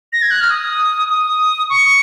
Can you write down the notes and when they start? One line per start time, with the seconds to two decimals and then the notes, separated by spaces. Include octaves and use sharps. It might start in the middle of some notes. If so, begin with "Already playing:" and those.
0.13 A#6
0.22 G#6
0.31 F#6
0.41 F6
0.50 D#6
1.10 D#6
1.70 C#6